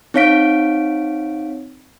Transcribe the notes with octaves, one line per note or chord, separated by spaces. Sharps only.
C4 D#4 C#5 F5 B6 D7